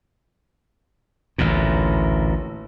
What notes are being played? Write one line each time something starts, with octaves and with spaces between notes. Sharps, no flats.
A1 D2 A#2